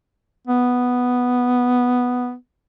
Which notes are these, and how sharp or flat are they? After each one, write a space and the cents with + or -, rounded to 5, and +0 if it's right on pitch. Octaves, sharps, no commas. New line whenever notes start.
B3 +0